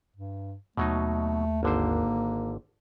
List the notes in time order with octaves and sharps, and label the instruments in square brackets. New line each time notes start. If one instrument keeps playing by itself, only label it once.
[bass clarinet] G2
[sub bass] D#2 [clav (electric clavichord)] B2 F#3 D#4 [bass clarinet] A3
[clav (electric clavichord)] G#1 D3 C5 [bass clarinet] A#3